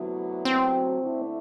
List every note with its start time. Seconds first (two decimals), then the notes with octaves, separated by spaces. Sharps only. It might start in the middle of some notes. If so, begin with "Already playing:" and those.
Already playing: D2 C3 F#3 B3 E4
0.45 C4
1.01 D3 A3 E4